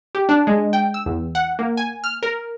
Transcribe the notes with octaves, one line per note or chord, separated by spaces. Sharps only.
G4
D4
G#3
G5
E6
E2
F#5
A#3
G#5
F6
A#4